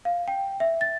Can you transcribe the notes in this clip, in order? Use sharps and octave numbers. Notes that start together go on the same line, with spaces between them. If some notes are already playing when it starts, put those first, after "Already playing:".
F5
G5
E5
A6